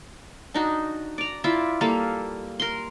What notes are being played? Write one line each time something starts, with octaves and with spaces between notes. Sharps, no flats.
D4 D#4 F#4
D5 A#5
E4 F4 D5 E5
G3 A#3 A4 F5
A#4 C6